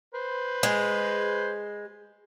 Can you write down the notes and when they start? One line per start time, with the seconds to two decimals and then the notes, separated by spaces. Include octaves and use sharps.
0.15 B4 C5
0.63 G#3